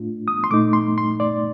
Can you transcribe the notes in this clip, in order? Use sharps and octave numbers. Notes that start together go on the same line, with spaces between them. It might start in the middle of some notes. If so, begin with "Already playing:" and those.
Already playing: A2 A3 D4 F4
D#6
C6
A#2 A3 D#4 D6
C6
C6
D5